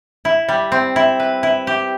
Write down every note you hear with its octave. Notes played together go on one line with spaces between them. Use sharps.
E4
G3
C4
E4
B4
E4
G4